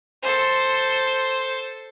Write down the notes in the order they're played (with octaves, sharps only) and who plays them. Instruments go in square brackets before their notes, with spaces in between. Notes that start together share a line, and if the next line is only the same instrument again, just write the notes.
[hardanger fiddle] A4 C5